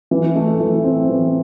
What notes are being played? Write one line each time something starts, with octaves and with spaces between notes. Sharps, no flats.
E3
A3
E3
C4
E3